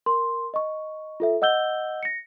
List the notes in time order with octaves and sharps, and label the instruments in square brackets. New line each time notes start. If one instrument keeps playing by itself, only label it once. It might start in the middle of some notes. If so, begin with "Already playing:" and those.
[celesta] A#4 C6
D#5 C#6
F4 A4 E5
D#5 F#5 E6 G6 G7
A#6 C#7